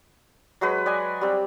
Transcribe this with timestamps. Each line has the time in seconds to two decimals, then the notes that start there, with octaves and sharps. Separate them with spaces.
0.61 F#3 G#3 B4
0.86 D5 D#5 G#5
1.21 G3 C4